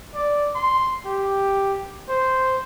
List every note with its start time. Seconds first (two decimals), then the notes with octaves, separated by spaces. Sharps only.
0.15 D5
0.55 C6
1.06 G4
2.09 C5